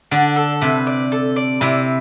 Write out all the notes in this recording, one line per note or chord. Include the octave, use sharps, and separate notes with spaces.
D3 D4
A4
C3 B4
D5
A4
D5
C3 E4